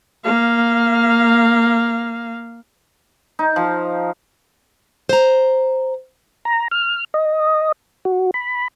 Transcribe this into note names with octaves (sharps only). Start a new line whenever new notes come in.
A#3 F5
D#4
F3
C5 A#5
A#5
F6
D#5
F#4
B5